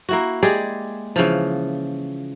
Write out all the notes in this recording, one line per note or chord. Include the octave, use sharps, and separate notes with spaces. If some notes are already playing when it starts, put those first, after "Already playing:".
A#3 E4 F#4
G#3 G4 G#4 D5
C#3 E3 F3